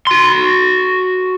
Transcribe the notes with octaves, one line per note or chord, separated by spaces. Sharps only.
F#4 C6